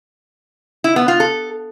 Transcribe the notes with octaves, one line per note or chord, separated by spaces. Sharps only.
E4
B3
F4
A4